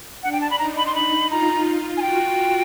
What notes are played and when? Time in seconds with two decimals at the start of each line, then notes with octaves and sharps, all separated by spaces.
0.23 D4 F#5
0.32 G5
0.41 A5
0.50 B5
0.58 D#4 A#5
0.77 B5
0.86 C6
0.95 B5
1.30 F4 A#5
1.66 F4
1.97 G#5
2.02 F#4 G5